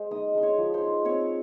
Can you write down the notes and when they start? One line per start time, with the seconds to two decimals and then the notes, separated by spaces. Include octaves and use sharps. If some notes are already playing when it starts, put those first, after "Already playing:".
Already playing: G#3 C5
0.11 D#4 D#5 D#6
0.35 G#3 C6
0.43 C#5 C#6
0.58 F3
0.74 C5 C6
0.82 D#4
1.05 C4 C#5 C#6